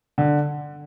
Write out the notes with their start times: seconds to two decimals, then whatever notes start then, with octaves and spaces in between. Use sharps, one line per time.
0.18 D3